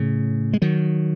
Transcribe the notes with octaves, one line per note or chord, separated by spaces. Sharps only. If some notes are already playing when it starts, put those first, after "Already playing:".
Already playing: A2 C#3
G#3
D#3 F#3